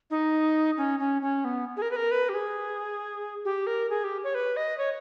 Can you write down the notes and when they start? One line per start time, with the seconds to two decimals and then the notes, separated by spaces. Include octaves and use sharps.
0.10 D#4
0.77 C#4
1.00 C#4
1.22 C#4
1.45 B3
1.77 G#4
1.82 A#4
1.91 B4
1.96 A#4
2.11 B4
2.29 G4
2.34 G#4
3.45 G4
3.67 A#4
3.90 G#4
4.04 G4
4.24 C#5
4.34 B4
4.56 D#5
4.78 C#5